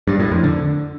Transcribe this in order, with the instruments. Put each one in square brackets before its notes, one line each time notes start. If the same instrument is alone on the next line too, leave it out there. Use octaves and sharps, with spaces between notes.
[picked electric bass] G2
A2
F2
D3